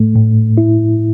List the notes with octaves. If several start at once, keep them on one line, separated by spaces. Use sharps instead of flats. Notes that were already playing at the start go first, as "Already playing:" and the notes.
Already playing: A2 A3
A2
E4